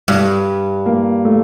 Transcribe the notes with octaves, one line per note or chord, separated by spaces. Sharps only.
G2 G3
A#3
A3